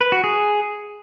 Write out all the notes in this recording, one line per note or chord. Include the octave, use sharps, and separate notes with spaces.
B4
F#4
G#4